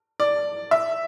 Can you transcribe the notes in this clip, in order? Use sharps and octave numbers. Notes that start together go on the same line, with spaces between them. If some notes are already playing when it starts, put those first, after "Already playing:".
D5
E5